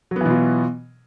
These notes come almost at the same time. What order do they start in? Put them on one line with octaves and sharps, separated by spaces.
F#3 B3 E3 B2 F4